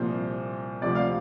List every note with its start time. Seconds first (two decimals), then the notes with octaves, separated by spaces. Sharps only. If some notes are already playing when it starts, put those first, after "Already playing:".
Already playing: C2 A#2 F3 C5
0.82 D2 C3 F3 D5
0.95 F5